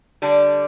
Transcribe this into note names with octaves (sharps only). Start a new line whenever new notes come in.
D3 G3 D4